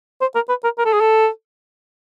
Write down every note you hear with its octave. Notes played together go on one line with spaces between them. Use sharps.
C5
A#4
B4
A#4
A#4
A4
G#4
A4